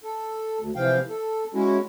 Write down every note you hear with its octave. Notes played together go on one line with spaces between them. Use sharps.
A4
D2
C3 E3 F3 F5 G5
A4
G#3 C#4 E4 F#4